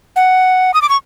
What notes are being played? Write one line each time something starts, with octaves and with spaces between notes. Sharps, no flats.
F#5
D#6
D6
C#6